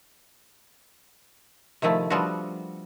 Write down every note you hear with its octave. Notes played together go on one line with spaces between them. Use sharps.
C3 D#3 F3 A3 E4
F3 G3 B3 C4 D4 F#4